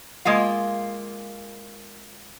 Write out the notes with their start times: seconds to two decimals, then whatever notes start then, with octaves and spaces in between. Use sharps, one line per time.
0.25 G#3 A#3 F4 F5